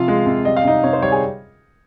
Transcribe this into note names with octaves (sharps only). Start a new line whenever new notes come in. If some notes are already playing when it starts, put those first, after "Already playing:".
Already playing: C3 F3 F4 F5
G#3
C3
G3 D#5
F5
C3 D#4 D#5
C3 C#5
C5
G3 C#5
G#4 G#5